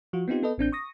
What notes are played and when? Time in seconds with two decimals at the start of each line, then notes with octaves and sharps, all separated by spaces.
0.13 F3 F4 F#4
0.28 B3 C4 D#4 F4 G4
0.43 B3 A4 B4 D#5
0.58 A1 C4 D4 G6
0.72 C#6 D#6 A#6